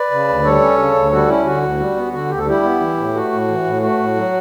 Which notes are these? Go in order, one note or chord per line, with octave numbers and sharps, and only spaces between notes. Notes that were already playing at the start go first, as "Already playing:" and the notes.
Already playing: B4 D5
C#3
D2
G3 A4 C#5
C#4
C#3
D2
G3 F#4 A4
C#4 E4
D3 F#4
D2
G3
B3
D3 F#4
D2 G4
A4
G3 E4 G4
B3
E3
A2
A3 F#4
A2
E3
A2
A3 F#4
A2
F#3